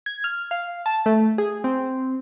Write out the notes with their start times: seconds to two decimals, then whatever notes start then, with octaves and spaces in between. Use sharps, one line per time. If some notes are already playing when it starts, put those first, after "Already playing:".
0.06 G#6
0.24 F6
0.51 F5
0.86 A5
1.06 A3
1.38 G#4
1.64 C4